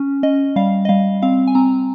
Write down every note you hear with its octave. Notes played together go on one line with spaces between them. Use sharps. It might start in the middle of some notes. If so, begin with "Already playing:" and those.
Already playing: C#4
C#4 D#5
G3 F5
D#5
G3 F5
C4 F5
G#5
C4 A#5